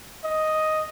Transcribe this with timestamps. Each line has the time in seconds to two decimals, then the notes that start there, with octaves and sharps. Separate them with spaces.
0.24 D#5